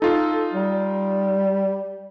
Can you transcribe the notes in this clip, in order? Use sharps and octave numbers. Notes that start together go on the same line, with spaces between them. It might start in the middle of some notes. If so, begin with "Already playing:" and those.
D#4 F4 A4
G3